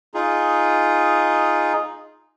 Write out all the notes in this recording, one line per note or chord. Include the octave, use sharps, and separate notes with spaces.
D#4 F4 G#4